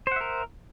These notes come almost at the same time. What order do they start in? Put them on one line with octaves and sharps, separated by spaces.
C5 F#5 E5 A#4